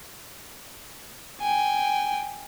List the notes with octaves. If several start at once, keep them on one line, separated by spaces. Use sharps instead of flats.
G5 G#5